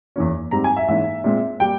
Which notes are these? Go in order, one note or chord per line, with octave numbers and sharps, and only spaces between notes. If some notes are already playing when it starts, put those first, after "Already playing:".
E2 E3 A#3 C#4
G#2 G3 C4 A#5
G#5
E5
G#2 E3 A#3 C#4 E5
A#2 G#3 C4
G3 A#3 G5